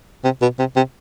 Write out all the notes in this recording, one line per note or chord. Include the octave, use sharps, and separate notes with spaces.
C3
B2
C3
C3